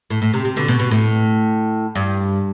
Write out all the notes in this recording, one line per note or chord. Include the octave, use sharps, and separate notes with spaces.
A2
A2
C3
C3
B2 D3
B2
B2
A2
G2